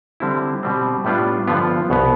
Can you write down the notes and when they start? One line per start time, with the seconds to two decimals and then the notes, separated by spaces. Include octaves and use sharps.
0.20 D3 G3 C4 E4
0.63 B2 G3 C4
1.05 A2 G3 B3 D4 F4
1.47 G2 D3 F3 B3 F4
1.90 C2 B2 B3